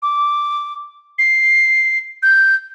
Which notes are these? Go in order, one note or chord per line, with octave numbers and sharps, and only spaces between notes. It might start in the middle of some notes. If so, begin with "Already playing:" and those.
D6
C7
G6